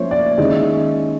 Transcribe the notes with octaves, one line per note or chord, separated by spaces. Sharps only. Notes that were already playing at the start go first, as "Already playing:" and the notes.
Already playing: F3 A#3 C#4 C5 C#5 E5
D5
D#3 G#3 C#4 E4 D#5